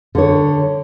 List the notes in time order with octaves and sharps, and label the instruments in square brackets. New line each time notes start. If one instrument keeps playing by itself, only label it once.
[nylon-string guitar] D3 C#5